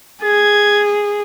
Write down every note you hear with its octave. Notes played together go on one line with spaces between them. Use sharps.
G#4 G#6